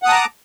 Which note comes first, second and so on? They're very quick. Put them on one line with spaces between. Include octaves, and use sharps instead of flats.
F#5 D#6 A5 A#5 D6